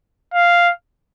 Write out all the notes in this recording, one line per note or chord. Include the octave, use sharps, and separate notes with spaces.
F5